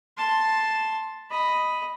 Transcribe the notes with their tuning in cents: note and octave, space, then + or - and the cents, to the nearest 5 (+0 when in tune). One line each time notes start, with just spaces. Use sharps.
A5 +0 C6 +5
D#5 +0 B5 +0